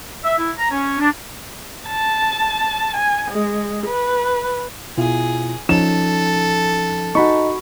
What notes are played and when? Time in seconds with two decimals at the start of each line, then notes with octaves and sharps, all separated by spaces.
0.24 E5
0.38 E4
0.57 A#5
0.71 C#4
0.99 D4
1.89 A5
2.97 G#5
3.31 G#3
3.86 B4
4.98 B2 E4 F4 G#4
5.69 F3 C#4 D#4 A4 E7
7.15 D#4 F#4 B5 C#6